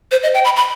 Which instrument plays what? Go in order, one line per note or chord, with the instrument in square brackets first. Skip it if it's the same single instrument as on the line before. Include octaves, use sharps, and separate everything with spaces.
[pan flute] C5
D#5
G5
B5
B5